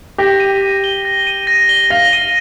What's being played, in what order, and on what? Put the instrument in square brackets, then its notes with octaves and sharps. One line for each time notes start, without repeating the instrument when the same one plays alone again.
[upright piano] G4 [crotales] A#6
[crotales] D#7
A#6
G7
A#6
D#7
A#6
G7
[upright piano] F5 [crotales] A#6
[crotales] D#7